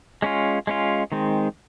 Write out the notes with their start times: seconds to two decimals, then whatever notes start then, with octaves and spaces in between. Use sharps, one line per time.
0.22 G#3 C#4 F4
0.67 G#3 C#4 F4
1.12 D#3 G#3 C4